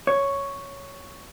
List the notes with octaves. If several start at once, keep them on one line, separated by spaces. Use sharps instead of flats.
C#5